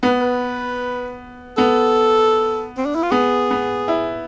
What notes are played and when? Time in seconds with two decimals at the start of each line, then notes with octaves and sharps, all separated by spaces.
0.03 B3 B4
0.21 B4
1.57 B3 A4
2.77 C4
2.86 D4
2.95 E4
3.03 F4
3.11 B3 G#4
3.51 B3
3.88 E4